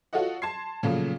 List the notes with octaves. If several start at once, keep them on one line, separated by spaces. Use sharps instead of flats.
F4 F#4 A4 C#5 D#5 F#5
A5 C6 G#6 C7
A#2 C#3 F3 F#3 A3